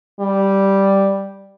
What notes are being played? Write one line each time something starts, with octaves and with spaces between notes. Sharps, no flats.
G3